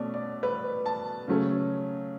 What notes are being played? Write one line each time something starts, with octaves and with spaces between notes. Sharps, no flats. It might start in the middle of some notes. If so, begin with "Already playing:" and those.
Already playing: B2 A3 C#4 D5
D5
B4
A5
C#3 F#3 A3 C#4